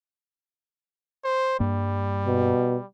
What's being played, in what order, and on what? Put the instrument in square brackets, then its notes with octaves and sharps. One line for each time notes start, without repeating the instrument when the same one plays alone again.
[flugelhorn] C5
[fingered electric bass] G2 A#3 [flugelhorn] G3
[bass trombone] B2